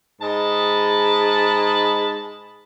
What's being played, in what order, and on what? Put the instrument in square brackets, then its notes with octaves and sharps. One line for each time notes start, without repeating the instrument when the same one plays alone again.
[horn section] G#2 G#4 D#5 A5 B5